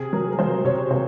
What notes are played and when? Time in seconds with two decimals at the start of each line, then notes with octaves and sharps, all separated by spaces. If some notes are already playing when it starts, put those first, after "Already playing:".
Already playing: C3 G#4
0.13 F#3 A#4
0.32 A#4
0.39 F#3 C5
0.65 C3 C#5
0.90 C3 C5